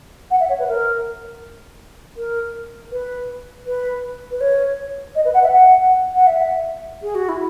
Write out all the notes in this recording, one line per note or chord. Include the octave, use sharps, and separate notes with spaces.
F#5
E5
C#5
B4
A#4
A#4
B4
B4
B4
C#5
D#5
B4
F#5
E5
F#5
F#5
E5
G#4
F#4
E4